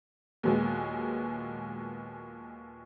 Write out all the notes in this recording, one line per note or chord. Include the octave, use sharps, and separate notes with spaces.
D#2 A#2 F#3 G#3 B3